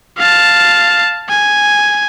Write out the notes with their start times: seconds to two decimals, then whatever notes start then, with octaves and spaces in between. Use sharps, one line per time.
0.18 F5 A5
1.29 G#5